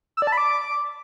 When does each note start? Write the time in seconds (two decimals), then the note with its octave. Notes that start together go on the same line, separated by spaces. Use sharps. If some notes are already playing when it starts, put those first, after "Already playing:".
0.17 E6
0.22 D5
0.27 A5
0.32 B5
0.38 D6